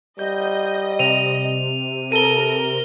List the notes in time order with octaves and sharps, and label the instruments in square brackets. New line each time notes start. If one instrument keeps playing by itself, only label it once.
[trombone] G3 [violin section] D#5 [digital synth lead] G6
[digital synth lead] C3 [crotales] D#7 F7
[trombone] A4 [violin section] A#4 [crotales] D#7 G7